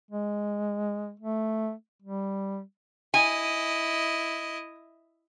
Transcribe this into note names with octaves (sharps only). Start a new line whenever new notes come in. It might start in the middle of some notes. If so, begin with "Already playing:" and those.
G#3
A3
G3
E4 D#5 G#5